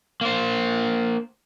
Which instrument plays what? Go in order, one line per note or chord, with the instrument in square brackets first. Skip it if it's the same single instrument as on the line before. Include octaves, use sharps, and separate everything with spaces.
[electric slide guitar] A#3 C5